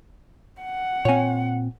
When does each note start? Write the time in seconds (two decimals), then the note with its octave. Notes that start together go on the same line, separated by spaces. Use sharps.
0.61 F#5
1.05 A#2 C4 C#5 G#5